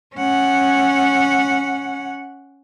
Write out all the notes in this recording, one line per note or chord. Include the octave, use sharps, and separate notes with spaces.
C#4 F#5